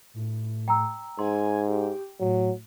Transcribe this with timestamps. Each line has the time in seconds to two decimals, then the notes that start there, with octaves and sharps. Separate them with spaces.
0.14 A2
0.68 G5 A#5 E6
1.19 G#2 G#5 C6
1.68 G4
2.20 A2 F#3